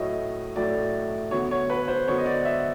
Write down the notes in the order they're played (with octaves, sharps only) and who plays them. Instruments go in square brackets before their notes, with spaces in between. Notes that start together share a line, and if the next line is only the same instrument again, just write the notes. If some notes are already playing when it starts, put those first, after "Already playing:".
Already playing: [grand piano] A2 F#3 A3 D#5
A2 F#3 A3 D5
D3 F#3 B3 C#5
C#5
B4
C5
D3 F#3 B3 C#5
D#5
D5
E5